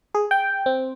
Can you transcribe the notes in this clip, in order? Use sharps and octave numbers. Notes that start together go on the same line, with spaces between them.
G#4
G5
C4